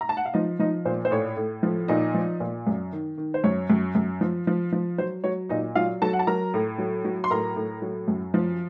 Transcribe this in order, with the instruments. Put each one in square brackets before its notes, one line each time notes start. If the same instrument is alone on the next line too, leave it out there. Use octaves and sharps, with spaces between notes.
[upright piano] A#5
A5
F#5
F5
F3 D#4 D#5
F3 D#4 D#5
A#2 C5
C5
A2 C#5
A2
F3
A#2 D#4 D#5
F3
A#2
F#2
D#3
D#3
C5
F#2 C#5
F#2
F#2
F3
F3
F3
F#3 C5
F#3 C#5
A#2 D#4 D#5
F#3 F4 F5
F#3 A4 A5
F#5
A5
F#3 A#4 A#5
A2
F#3
F#3
C6
A2 A#4 A#5
A2
F#3
F#2
F3